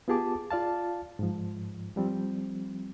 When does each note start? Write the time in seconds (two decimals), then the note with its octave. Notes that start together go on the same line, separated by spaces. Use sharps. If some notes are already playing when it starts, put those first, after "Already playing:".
0.08 B3 F4 G4 G#4 A5 D6
0.51 F4 D5 F5 A5
1.19 G#2 F3
1.96 F3 G3 C4